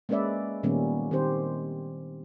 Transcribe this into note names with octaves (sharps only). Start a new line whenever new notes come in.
G#3 A#3 C#4 B4 D5 E5
A#2 D#3 G3 A#3 B3 C#4
D#3 C4 G4 C5